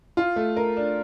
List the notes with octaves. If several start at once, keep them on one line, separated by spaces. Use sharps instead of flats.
F4
A3
A#4
D4